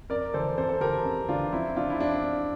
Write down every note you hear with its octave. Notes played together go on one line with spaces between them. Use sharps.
F2 A#4 D5
E3 A4 C5
F2 A4 C5
A4
E3 G4 A#4
F2
E3 D4 F4
F3 C4 E4
C3 D4 F4
E4
F2 D4 F4
F2